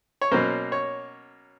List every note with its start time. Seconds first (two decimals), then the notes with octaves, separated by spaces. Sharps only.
0.21 C#5
0.31 B2 F#3 A#3 C#4 C5
0.72 C#5